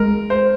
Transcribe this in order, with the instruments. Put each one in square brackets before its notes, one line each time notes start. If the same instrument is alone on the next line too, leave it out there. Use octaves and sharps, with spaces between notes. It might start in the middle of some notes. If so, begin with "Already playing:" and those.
Already playing: [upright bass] G#3 [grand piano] A#4
[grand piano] C5